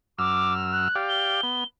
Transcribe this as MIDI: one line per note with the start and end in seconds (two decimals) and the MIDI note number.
0.19 0.88 42
0.19 0.54 86
0.19 0.88 88
0.19 0.88 89
0.72 0.96 90
0.95 1.41 67
0.95 1.41 74
0.95 1.41 77
1.09 1.65 103
1.43 1.64 59